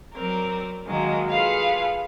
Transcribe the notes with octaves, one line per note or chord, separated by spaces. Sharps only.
F#3 C4 A#4 D5
D#3 F#3 G#3 A#3
F4 G#4 A4 B4 F5 B5